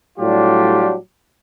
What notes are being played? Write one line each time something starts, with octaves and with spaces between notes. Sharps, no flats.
A2 F#3 G3 D4 F4 G4